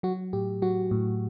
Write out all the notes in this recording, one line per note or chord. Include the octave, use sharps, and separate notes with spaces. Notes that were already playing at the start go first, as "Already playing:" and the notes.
F#3 F#4
A2 G4
F#3 F#4
A2